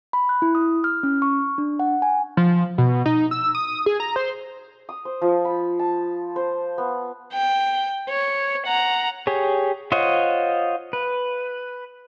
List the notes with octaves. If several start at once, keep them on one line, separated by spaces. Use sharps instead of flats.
B5
F#6
E4
D#6
F6
C#4
C#6
D4
F#5
G#5
F3
B2
D#4
E6
D#6
G#4
A#5
C5
D#6
C5
F3
B5
A5
C5
B3
G5
C#5
F#5 A#5
G4 G#4 C#5
F4 C5 C#5 D#5 F#5
B4